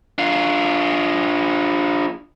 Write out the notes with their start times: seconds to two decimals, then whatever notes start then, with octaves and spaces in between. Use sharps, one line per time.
0.18 D4 F4